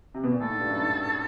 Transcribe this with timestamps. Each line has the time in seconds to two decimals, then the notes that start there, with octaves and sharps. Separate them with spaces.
0.14 C3
0.23 B2
0.32 A#2
0.40 A2 A4
0.50 G#2
0.60 G2
0.70 F#2
0.80 G#2